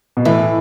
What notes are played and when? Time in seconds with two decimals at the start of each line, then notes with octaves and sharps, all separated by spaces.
0.17 B2
0.25 A2 E3